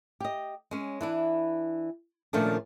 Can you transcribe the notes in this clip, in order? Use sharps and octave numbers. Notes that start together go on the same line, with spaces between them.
G4 D#5
G#3 C#4
E3 D4 E4
A#2 D#3 F3 A3 C#4 D4